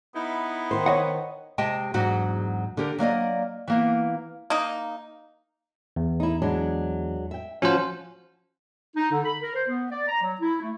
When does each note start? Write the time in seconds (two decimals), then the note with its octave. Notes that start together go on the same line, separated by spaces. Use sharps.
0.15 B3 D#4 E4
0.71 D#3 C5
0.86 C#5 D#5 F#5
1.58 C3 G#3 G4 D#5 G5 A5
1.94 E2 G#2 F#3 D4 F#4 F#5
2.77 D3 G4 A#4
2.99 F#3 A#3 D5 D#5
3.68 E3 A#3 B3
4.50 A#3 D#4
5.96 E2
6.20 D#4 E4
6.42 F#3 G#3 D4
7.31 E5 G5
7.62 F3 C#4 F#4 C5 F5
8.96 D#4
9.12 D3
9.24 B5
9.42 A#4
9.55 C5
9.68 B3
9.91 D5
10.08 A#5
10.22 F#3
10.41 E4
10.61 A3